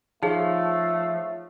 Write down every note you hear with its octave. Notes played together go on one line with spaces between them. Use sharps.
F3 A3 D#4 G#4 C#5 F5